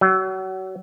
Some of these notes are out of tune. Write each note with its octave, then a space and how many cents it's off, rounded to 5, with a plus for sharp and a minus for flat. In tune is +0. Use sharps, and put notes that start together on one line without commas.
F#3 +30